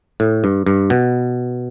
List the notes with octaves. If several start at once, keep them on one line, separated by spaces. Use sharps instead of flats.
A2
G2
G2
B2